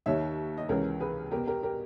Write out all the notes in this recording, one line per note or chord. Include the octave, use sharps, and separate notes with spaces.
D#2 D#3 C#5 E5
D#5
C#2 C#3 E3 A#4 C#5
G#4 B4
E2 B2 G4 A#4
G4 A#4
G4 A#4